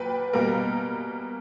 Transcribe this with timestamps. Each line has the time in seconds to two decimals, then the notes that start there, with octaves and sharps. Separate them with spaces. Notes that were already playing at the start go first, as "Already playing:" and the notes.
Already playing: A#2 F#3 B4 G5
0.33 B2 G3 A#3 A#4